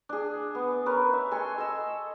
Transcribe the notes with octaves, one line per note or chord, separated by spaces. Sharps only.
D4 G#4
B3
C#4 A#4 B4
E5
A4 G#5 C6 C#6
A4 D#5 E6